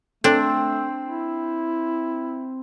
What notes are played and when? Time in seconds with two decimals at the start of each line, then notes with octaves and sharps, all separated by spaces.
0.24 A3 C4 D4 A4
1.08 E4